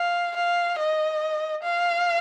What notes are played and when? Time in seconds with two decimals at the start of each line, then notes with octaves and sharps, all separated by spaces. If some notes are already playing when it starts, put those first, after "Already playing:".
Already playing: F5
0.36 F5
0.79 D#5
1.63 F5